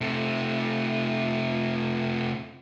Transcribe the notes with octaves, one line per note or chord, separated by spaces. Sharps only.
C3 A3